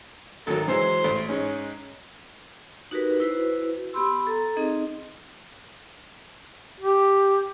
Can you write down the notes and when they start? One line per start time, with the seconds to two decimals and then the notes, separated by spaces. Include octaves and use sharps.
0.47 G#1 F#3 A4 A#4
0.68 E3 F#3 G#3 C5
1.01 A1 A3
1.28 G#2 G#3 C#4
2.91 D#4 F#4 G4 A#4 B4
3.20 E4 F#4 B4 C5
3.93 B3 G4 B5 C6 E6
4.27 A4 A#5
4.56 C4 D#4 G#4 D#5
6.80 G4